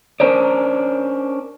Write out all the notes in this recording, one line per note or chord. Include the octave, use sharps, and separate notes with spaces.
C#4 D4 A#4 C5 D5